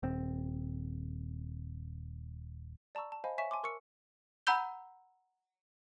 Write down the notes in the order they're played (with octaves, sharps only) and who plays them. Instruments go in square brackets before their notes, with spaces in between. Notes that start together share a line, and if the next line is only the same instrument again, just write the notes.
[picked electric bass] D#1 C4
[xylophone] D5 A5 A#5 C#6 E6
A5
C5 D#5 F5 G#5 B5
C#5 E5 G#5 C#6 B6 E7
G#5 A5 C6 D6
A#4 C#6 E6 C#7
F#5 A#5 B5 E6 G6 G7